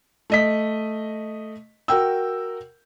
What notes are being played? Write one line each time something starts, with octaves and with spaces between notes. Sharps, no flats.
A3 D#5 B6
F#4 A#4 G5 E6